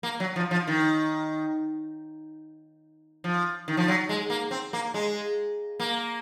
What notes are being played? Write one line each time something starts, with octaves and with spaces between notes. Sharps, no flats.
A#3
F#3
F3
F3
D#3
F3
D#3
F3
F#3
G#3
A#3
C4
A#3
G#3
A#3